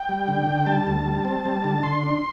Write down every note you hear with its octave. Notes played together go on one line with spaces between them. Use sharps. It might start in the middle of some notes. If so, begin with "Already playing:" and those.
Already playing: G5
G3
D3
D3
G3 A5
D2
G3
C4
G3
D3
D3 C6
D4